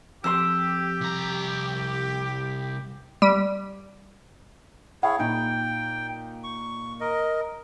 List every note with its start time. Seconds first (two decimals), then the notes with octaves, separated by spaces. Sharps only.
0.24 F2 G4 A4 C6 E6
1.01 C2 A#5
3.22 G3
5.03 E4 G#4 C#5 F5
5.19 A#2 D#4 G5
6.44 C#6
7.00 A#4 D#5